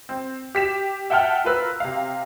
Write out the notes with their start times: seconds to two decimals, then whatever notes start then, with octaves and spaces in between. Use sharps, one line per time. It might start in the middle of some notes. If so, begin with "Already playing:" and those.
0.09 C4
0.55 G4 B6 E7
1.10 E5 F#5 G5 A5 F6
1.44 F4 A#4 B4 E6
1.80 C3 F5